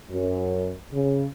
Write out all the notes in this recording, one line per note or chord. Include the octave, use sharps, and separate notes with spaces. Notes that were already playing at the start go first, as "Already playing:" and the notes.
F#2
C#3